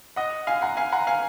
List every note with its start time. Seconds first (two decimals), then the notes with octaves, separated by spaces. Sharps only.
0.16 D#5 F#5
0.47 F5 G#5
0.62 F#5 A#5
0.77 F5 G#5
0.92 F#5 A#5
1.07 F5 G#5